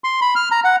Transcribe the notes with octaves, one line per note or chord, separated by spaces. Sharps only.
C6
B5
F6
A#5
F#5